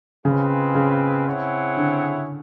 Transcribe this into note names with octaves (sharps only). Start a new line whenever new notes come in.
C#3 G#3 C4 F4 G#4 B4
C#3
C4 E4 G#4 C#5 F#5
D3